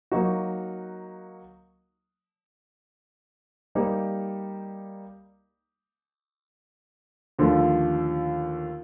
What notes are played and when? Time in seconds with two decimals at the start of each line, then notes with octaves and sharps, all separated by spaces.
0.12 F#3 A#3 D#4 F#4
3.75 G3 A#3 D#4 G4
7.39 D#2 D3 F3 A3